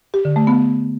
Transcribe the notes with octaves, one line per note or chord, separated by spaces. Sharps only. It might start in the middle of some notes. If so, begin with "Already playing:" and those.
G4
D3
A3
B3